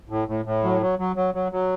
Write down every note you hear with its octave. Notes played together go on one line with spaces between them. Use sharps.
A2
A2
A2
F#3
F#3
F#3
F#3
F#3
F#3